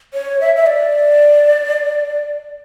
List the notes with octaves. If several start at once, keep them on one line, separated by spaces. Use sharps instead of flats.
C#5
E5
E5
D5